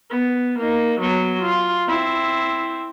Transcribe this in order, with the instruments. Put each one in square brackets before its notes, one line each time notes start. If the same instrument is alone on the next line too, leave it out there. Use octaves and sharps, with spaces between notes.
[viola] B3
A#3 D#4
F#3 B3
F4
C4 E4